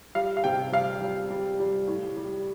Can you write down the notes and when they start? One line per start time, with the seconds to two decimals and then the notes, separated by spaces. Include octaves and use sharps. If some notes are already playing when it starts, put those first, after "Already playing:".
0.15 G3 F5
0.37 F5
0.44 C3 G5
0.72 G3 F5
1.02 G3
1.30 G3
1.60 G3
1.88 A2
2.17 G3